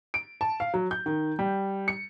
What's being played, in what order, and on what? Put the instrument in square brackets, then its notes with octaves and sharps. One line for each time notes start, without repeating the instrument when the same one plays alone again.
[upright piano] D7
A5
F5
F#3
G6
D#3
G3
C#7